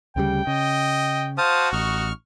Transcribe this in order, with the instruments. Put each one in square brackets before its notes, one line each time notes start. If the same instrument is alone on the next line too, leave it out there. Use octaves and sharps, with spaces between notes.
[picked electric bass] D2 C#3 G3 [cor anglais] G5
[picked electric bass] C#3 [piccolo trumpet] D#5
[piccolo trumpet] F#4 [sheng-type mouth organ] C5 A5 D#6 [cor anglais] F5
[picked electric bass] A1 [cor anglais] D#4 [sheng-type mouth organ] C#6 F6